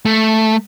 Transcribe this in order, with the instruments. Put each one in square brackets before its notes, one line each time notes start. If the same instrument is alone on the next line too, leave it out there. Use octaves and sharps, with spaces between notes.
[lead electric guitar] A3